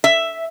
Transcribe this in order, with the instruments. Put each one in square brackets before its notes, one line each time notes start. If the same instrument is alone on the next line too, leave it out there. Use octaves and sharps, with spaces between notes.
[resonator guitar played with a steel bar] E5